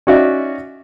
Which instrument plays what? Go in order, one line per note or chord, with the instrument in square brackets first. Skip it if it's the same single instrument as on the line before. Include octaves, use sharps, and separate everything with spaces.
[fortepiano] C#4 D#4 F#4 D5 E5